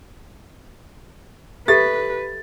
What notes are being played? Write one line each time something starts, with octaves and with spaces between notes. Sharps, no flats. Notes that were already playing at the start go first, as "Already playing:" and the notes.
G4 A4 B4 E5 A6